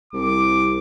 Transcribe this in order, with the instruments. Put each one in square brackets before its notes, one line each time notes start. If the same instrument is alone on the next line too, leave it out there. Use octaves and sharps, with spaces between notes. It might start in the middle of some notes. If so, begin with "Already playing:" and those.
[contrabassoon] C2 [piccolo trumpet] D6